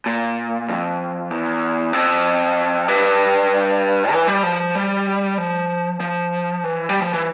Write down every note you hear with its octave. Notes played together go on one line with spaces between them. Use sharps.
A#2
F2
E2
F2
G2
E3
G3
F3
G3
F3
F3
E3
G3
F3
E3